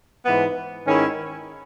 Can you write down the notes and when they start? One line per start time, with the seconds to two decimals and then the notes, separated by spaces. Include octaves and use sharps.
0.25 G#2 E3 B3
0.84 G#2 D#3 G#3 C#4 E4